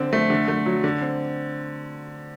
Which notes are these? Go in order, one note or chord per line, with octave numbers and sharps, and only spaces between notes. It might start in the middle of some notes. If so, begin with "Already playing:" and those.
Already playing: D3 C4
A3
D3
A3
F#3
D3
C4